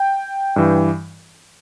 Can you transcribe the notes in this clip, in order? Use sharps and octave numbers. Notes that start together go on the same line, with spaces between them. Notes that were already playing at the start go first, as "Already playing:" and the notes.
Already playing: G5
G2 E3